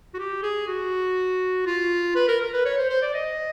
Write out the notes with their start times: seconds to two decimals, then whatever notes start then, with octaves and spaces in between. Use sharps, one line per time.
0.14 F#4
0.19 G4
0.43 G#4
0.67 F#4
1.66 F4
2.15 B4
2.28 A#4
2.41 A#4
2.53 B4
2.65 C#5
2.78 C5
2.89 C5
3.02 D5
3.14 D#5